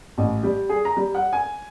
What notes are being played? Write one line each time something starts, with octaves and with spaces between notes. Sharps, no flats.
A1
G3
G#4
A#5
G3
F#5
G#5